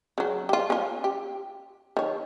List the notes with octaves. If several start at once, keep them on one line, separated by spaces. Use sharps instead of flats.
C#3 F#3
F4 G4
C#4 F4
G4
D#3 C#5